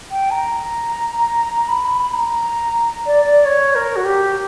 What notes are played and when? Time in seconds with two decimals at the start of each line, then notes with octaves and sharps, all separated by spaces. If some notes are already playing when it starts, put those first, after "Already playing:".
0.11 G5
0.31 A#5
1.68 B5
1.84 B5
1.98 B5
2.13 A#5
3.06 D5
3.25 D5
3.45 C#5
3.75 A#4
3.96 F#4
4.04 G4